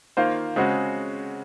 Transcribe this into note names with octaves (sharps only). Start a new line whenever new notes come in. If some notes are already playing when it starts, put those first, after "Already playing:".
D#3 A#3 F4 C5
C#3 G#3 C4 F#4